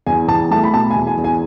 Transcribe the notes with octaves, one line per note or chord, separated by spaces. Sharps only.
E2 G#5
E2 A5
A3 A5
B5
B2 A5
G#5
E2
G#5
E2
G#5